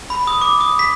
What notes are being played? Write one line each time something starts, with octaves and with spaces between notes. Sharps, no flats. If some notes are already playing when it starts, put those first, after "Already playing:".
B5
D#6
D6
D#6
B6